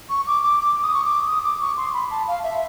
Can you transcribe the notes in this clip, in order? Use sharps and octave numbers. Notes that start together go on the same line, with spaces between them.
C#6
D6
D6
D6
D#6
C#6
D6
D#6
D6
C#6
C6
B5
A5
F5
E5